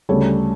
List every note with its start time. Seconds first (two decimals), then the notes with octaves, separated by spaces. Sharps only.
0.09 D2 C#3 G3 A4 C#5